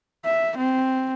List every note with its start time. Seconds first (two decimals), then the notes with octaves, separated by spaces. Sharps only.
0.25 E5
0.58 C4